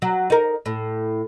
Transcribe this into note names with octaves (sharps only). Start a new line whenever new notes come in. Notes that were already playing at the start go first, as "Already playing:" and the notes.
F#3
D#4 A#4
A2